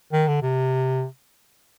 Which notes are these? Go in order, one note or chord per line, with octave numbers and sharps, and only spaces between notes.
D#3
D3
C3